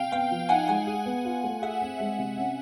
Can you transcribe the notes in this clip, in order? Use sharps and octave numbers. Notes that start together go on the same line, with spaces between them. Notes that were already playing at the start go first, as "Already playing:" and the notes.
Already playing: C3 F5 G5
B3 F5 G5
F3
D#4 F#5 G#5
G#3 F#5 G#5
G#4
B3
F4
A3
G#4 E5 F#5
C4
G#3
C3
C#4